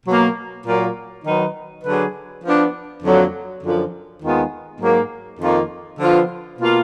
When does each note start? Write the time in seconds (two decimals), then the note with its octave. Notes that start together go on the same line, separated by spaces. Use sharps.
0.06 B2 F#3 A#3
0.66 A#2 F#3 A#3 F4 A#4
1.25 D#3 F#3 B3 D#4
1.84 D3 F#3 D4 G#4 B4
2.44 F3 B3 D4
3.03 F2 D3 F#3 A#3
3.62 F#2 D3 F3
4.22 D#2 D#3 G#3 B3 F4
4.81 G#2 F#3 A#3
5.40 F2 D#3 A#3 F4
6.00 D3 F3 B3 F4
6.59 B2 A#3 F4